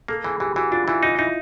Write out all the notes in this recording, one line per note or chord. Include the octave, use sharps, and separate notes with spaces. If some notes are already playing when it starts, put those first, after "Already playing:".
A#3 A4
E3 G#4
E3 G4
E3 F#4
D4 F4
E3 E4
D#4 F4
D#4 E4